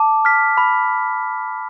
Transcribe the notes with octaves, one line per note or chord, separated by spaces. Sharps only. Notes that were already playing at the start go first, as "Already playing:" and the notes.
Already playing: A5 D6
F6 B6
B5